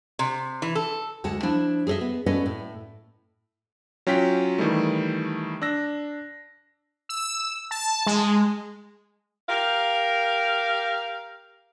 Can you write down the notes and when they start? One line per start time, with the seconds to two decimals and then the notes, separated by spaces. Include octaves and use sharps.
0.19 C3
0.62 E3
0.75 A4
1.24 D2 G#3 F#5 A5
1.43 F3 D4 E4
1.87 G#4 A4 C5 D#5 E5
2.01 B3
2.26 B3 C#4 A4 B4 D5 D#5
2.46 A2
4.07 F#3 C#4 F4 G5 B6
4.58 D#3 E3 G3 A3
5.62 D4 E6 A#6
7.09 E6
7.71 A5
8.06 G#3
9.48 G4 A#4 F5